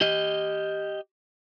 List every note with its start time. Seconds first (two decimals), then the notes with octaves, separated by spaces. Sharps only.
0.01 G4 D#5